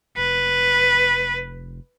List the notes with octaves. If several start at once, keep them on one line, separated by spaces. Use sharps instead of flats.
F1 B4